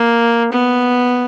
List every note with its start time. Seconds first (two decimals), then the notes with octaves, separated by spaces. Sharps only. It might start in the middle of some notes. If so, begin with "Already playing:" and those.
Already playing: A#3
0.52 B3